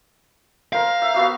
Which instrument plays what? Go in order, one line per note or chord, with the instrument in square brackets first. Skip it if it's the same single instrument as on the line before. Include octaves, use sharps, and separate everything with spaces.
[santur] A#4 C5 [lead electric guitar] F5
[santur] E5
B3 F#4 E6